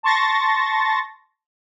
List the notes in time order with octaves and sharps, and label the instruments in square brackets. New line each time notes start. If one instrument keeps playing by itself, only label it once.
[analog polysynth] A5 C6 C#6 A6 A#6